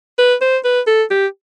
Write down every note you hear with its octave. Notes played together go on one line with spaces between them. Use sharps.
B4
C5
B4
A4
G4